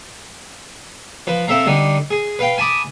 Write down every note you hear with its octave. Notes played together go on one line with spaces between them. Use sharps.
F3 B4
C4 A4 E5 F5 A#5
D3 G3 D4 D#4
G#4
B4 F5 G5
G#5 A5 B5 D6 D#6